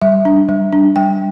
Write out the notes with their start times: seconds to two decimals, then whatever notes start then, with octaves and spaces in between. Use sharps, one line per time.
0.02 G3 E5
0.25 D4
0.49 G3
0.73 D4
0.96 G3 G5